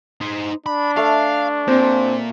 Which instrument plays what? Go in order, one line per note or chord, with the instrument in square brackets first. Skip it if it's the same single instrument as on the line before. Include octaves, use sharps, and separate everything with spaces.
[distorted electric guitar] D#4 C5
[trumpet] D4 [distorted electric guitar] B5
[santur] A3 [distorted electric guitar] F5
[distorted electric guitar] A#2 [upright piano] C4